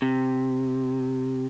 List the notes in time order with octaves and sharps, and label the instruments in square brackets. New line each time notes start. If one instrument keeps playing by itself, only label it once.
[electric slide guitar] C3